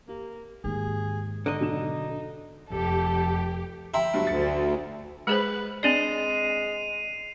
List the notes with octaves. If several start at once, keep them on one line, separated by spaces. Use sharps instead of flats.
A#3 G4
D#2 G#2 D#3 G#4
D3 D#4 D#5
B1 D4 E7
F1 G4 A4
E4 G5 A#5 C6
G2 F#3
D2 A6 C#7
G#3 G#4 B4 C5
G#3 C4 D4 D5 C7 D#7 F7